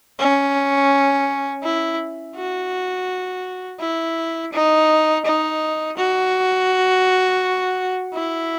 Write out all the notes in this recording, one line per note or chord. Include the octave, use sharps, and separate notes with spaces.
C#4
E4
F#4
E4
D#4
D#4
F#4
E4